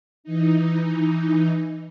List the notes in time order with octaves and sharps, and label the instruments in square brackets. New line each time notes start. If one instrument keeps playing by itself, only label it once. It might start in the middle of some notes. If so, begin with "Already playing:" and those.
[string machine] E3 D#4